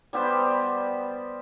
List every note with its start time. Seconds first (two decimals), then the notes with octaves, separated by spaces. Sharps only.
0.13 G3 B3 G4 C5